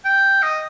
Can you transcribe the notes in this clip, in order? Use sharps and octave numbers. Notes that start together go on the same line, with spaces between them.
G5
D#5